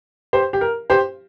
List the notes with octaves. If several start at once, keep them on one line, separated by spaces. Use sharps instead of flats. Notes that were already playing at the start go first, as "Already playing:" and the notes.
G4 C5
G4
A#4
G4 C5